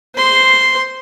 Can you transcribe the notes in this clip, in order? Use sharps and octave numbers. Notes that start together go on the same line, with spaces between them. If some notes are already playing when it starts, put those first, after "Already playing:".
C5 C6